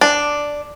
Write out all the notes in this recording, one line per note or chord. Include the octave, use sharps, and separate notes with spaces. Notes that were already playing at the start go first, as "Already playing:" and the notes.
D4